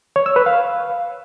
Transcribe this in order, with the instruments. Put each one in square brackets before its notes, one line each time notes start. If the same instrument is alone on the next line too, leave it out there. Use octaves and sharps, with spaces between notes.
[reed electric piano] C#5
E6
B4
F5